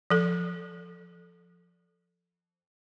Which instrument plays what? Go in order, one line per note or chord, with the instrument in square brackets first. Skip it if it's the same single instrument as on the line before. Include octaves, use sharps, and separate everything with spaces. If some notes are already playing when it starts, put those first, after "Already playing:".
[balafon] F3 A4